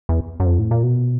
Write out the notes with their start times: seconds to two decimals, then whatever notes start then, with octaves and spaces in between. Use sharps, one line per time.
0.09 E2
0.40 F#2
0.46 F2
0.59 A2
0.71 A#2
0.83 B2